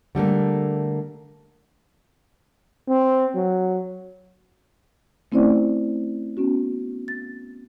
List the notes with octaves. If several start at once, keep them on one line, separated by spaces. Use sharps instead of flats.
D3 G3 A3 A#3
C4
F#3
A3 C4 C#4 E4 C5 D5
B3 C#4 F#4
A6